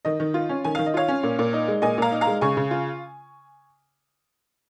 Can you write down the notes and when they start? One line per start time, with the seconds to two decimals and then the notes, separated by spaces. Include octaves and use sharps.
0.05 D#3 D#5
0.20 D#3
0.34 F4
0.49 C#4
0.64 D#3 G#5
0.75 D#3 F5
0.86 D#5
0.94 F4 C#5 F5
1.08 C#4
1.23 A#2
1.39 A#2
1.53 D#4
1.68 G#3
1.82 A#2 D#5 G#5
1.98 A#2 F5 A#5
2.11 D#4
2.21 F5 A#5
2.27 G#3
2.41 C#3 G#5 C#6
2.57 C#3
2.71 F4